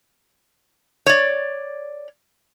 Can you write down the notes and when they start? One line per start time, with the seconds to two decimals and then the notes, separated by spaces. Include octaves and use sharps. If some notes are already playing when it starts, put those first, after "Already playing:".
1.06 C#5 D5